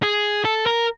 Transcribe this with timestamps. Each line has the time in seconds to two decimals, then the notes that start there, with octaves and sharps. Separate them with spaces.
0.03 G#4
0.45 A4
0.66 A#4